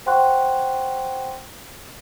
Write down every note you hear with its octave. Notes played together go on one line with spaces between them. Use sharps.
C5 F#5 G5 C6 C#6 F#6